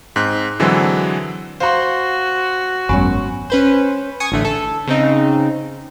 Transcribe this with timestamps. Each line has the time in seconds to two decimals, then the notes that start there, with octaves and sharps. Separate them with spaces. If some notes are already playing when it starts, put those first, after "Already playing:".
0.16 G#2 C4 F#6
0.60 D3 E3 F#3 G#3 C4 A4
1.60 F#4 C5 F5 C6
2.89 G#1 F#2 F#3 G#3 B3 C#4
3.50 C#4 B4 C5
4.20 G#5 C#6 D#6
4.32 A1 D3 A3
4.45 A4
4.87 C#3 C4 D#4